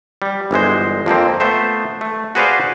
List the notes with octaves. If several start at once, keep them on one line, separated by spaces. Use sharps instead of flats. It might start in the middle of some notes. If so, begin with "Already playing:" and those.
G3
G1 E3 G#3 C5
F2 F3 A#3 C4
A3 B3 C5 E5
A3
F#4 G#4 B4 C5 D5 F5